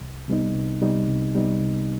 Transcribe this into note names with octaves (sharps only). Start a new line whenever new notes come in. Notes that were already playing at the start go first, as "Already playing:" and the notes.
C2
C3 G3 B3 D#4
C2
C3 G3 B3 D#4
C2
C3 G3 B3 D#4
C2